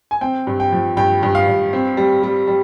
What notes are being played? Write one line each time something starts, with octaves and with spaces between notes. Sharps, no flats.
G#5
C4 G5
G2
G5
F3
G2 G5
G2
F5
G2
C4
G3
G3
G3